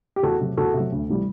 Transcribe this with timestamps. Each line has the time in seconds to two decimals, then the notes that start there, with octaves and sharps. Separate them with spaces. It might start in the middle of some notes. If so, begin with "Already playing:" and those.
0.16 G4
0.23 E2 F#4 A4
0.41 C3 F#3
0.57 E2 F#4 A4
0.74 C3 F#3
0.92 D2
1.08 C3 E3 G3